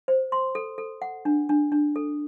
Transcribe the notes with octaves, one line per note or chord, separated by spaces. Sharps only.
C5
C6
A4
A4
F#5
D4
D4
D4
A4